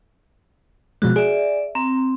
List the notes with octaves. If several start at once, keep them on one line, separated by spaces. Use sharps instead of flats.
B2 F3 G#3 F#4
G#4 D5 E5
C4 A#5